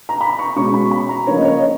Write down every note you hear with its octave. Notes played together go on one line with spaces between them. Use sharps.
A#5
B5
C#6
B2 G#3 C#4 C#6
B5
B5
A#5
C#3 F3 A#3 C#4 C#5
D#5
C#5
D#5
C#5